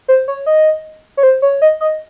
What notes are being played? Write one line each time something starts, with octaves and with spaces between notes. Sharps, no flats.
C5
C#5
D#5
C#5
C5
C#5
D#5
D#5